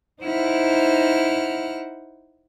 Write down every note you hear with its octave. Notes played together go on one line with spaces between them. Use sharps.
D#4 E4 C5 F#5 F6